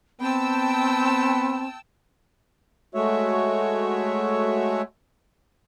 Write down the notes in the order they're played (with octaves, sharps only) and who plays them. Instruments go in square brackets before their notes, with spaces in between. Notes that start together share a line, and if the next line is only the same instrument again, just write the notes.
[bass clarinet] B3 [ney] C4 [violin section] G5 A5 E6
[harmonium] G#3 A3 F#4 C#5 E5